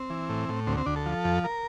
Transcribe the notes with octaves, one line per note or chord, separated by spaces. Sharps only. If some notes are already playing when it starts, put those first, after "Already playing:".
Already playing: C4
E3
A2
A2
D2 C4
C4
D2 D4
A4
F3
F2
A#4